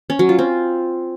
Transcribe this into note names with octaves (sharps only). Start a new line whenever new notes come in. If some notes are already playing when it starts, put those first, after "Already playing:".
C#4
F#3
F4
C4